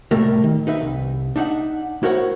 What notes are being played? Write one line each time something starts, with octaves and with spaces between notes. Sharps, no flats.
C#2 A2 C3 G3 A3 A#4
D#3
D#4 B4 E5
C2
D4 D#4 E5 F#5
E4 F#4 A#4 C5 C#5 F#5